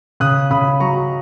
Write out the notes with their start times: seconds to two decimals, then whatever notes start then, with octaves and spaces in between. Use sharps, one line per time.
0.20 C#3 D#6 F#6
0.51 C#3 B5 D#6
0.80 F#3 A#5 C#6